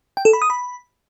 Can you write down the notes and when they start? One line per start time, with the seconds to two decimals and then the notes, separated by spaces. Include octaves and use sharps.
0.17 G5
0.25 A4
0.33 B5
0.42 D#6
0.50 B5